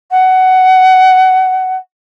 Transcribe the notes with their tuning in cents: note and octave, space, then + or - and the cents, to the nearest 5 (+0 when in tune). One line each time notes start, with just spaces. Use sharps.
F#5 +15